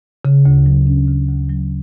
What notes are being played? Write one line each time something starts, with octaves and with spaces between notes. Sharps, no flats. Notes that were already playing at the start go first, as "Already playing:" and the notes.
C#3
D2
F#3
C#4
C#3
D2
F#3